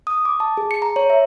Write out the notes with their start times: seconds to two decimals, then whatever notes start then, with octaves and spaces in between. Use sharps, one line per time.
0.07 D#6
0.25 D6
0.40 A5
0.57 G#4
0.71 C#7
0.82 A#5
0.96 C#5
1.10 E5